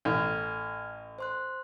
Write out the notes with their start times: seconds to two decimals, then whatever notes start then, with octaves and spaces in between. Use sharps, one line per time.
0.05 A1 F6 G#6
1.19 C5 C6 F#6